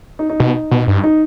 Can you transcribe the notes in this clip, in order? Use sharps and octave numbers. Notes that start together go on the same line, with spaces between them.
D#4
D#4
B2
B2
G2
D#4